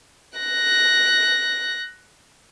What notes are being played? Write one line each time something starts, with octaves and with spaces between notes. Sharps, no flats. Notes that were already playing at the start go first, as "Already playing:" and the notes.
F#6 A#6